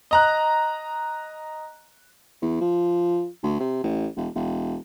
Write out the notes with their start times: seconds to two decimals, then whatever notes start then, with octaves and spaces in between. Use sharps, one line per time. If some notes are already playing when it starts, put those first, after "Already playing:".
0.11 D#5 A#5 F#6
2.42 E2
2.61 F3
3.43 D2
3.60 C3
3.84 A1
4.16 E1
4.35 E1